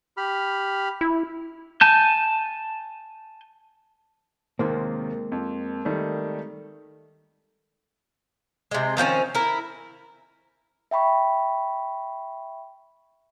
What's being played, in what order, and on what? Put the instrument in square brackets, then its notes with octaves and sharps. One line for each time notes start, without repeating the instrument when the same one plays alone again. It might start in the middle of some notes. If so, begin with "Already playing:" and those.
[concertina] G4 B5 F6
[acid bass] E4
[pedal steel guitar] G#5 A5 G6
[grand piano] D#2 C3 D#3 [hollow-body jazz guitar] G#3 A#3 C4
[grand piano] F2
D#3 G3 A3
[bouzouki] C3 G#3
D#3 F3 C4 C#4
E4 A#4
[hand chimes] E5 G5 B5 C#6